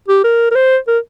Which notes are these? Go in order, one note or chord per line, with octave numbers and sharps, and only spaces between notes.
G4
A#4
A#4
C5
A#4